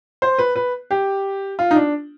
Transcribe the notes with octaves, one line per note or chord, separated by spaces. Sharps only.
C5
B4
B4
G4
F4
D#4
D4